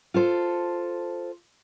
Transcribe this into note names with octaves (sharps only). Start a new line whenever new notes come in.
F4 A4 C5